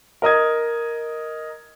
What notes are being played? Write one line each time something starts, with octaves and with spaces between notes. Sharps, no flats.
A#4 D#5 D#6 G#6